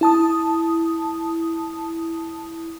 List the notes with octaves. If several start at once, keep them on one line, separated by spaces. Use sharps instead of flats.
E4 A5 D#6